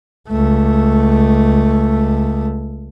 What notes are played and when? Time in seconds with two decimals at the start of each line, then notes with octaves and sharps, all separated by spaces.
0.29 C#2 A3